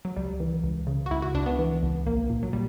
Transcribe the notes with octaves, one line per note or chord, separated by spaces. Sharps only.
F#3
C#2 G3
E3
C#2
C#3
F#4
C#2 E4
F#4
C#2 D4
B3
E3
C#2
A#1 A#3
A#2
F#3
A#2 G3